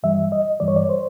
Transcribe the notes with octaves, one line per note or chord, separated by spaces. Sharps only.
G2 E3 G3 E5
D#5
G2 E3 G3 D5
C#5
D5
C5